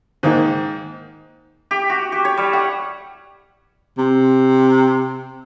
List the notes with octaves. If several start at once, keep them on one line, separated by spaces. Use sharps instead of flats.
G#2 D#3 A#3
G4
F#4
G4
C#5
G3
F#5
C3